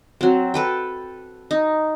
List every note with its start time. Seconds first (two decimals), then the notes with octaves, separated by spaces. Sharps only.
0.21 F#3 C4
0.54 A4 B4 G5
1.51 D#4